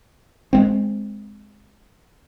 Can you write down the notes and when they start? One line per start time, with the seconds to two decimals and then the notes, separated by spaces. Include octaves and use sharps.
0.53 G#3 A#3 C4